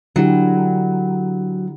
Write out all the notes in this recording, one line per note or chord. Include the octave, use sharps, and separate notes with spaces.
D3 F#3 E4 G4